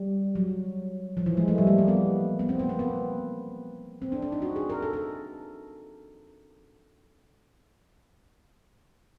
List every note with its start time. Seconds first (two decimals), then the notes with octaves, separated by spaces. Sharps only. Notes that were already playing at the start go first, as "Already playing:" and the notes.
Already playing: G3
0.35 F#3
1.17 F3
1.26 E3
1.37 G#3
1.48 A3
1.58 G3
1.67 A#3
1.78 A#3
1.88 B3
2.39 B3
2.49 C4
2.59 B3
2.69 A#3
2.79 B3
4.02 C4
4.12 D4
4.22 D4
4.32 D#4
4.42 F#4
4.56 G#4
4.70 A#4
4.82 A4
4.93 A4